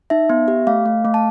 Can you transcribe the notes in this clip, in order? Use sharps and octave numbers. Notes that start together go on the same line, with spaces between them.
D#4 E5
B3
G4
A3 F5
A3
A3
A5